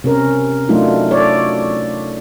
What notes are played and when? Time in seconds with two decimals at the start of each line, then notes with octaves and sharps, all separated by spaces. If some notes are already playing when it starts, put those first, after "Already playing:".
0.04 C3 C#4 A#4
0.69 F#3 A3 D4 D#4 F4
1.11 A4 C#5 D5